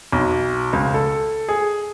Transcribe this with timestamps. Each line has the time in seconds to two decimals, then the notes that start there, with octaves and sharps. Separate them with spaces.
0.13 B1
0.73 C#2
0.94 A4
1.49 G#4